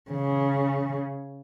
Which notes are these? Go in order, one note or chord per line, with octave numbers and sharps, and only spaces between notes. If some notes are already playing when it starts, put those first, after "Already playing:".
C#3